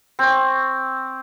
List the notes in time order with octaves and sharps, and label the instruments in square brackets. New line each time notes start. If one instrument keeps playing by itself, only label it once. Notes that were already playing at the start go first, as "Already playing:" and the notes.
[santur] C4 C#6